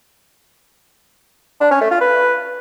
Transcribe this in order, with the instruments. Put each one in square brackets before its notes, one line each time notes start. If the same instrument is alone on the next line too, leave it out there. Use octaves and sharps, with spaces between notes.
[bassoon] D4
C#4
A3
F4
B4